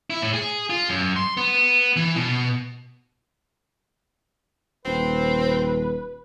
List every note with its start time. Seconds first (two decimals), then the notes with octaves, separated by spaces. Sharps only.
0.10 E4
0.22 A2
0.33 G#4
0.70 F4
0.89 F#2
1.16 C6
1.37 B3
1.96 E3
2.16 B2
4.85 D#1 C4 B4